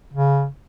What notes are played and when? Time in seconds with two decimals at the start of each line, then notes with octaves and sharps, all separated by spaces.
0.13 C#3